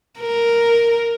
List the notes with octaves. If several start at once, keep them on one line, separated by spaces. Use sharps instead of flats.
A#4